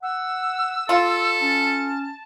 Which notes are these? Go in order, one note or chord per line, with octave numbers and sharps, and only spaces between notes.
F#5 E6
F4 A4
C#4 A5